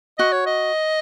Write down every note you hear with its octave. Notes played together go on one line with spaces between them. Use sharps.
F#4 D#5
C#5
D#5